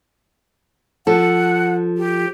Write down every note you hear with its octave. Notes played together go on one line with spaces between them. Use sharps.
F3 A4 F#5
G4